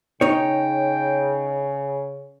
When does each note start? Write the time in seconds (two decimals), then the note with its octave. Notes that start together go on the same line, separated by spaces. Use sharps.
0.21 C#3 D#4 C#5 G5